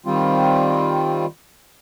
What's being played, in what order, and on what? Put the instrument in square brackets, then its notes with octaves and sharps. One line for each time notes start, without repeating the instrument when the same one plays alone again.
[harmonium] D#3 G3 C4 F4